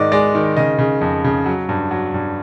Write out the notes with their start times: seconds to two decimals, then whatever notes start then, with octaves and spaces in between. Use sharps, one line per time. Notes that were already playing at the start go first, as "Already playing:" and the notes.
Already playing: G#2 D#3 D5 D#5
0.12 G#3 D5
0.35 D#3
0.57 C#3 D#5
0.79 C#3
1.01 F2
1.24 C#3
1.46 F#3
1.69 G2
1.91 F#3
2.14 G2